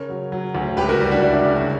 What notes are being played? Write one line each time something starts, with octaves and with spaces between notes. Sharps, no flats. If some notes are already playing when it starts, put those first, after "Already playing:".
Already playing: C#3 A#4 C#5
F#3
F#3
D2
C#2 G4 B4
F#4 A#4
G3
D4 F#4
G3 E4
D4
C#3 E4
D4 F#4